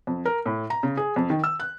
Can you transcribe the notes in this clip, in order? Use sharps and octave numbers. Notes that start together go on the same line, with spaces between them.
F2
A#4
A2
A#5
C#3
G#4
F2
D#3
E6
F#6